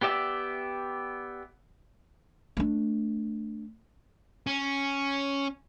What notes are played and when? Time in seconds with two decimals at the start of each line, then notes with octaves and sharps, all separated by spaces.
0.01 B3 G4 D5 E5 D6
2.57 A3 D4
4.47 C#4